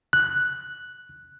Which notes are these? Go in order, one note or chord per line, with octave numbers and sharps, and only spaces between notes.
F#6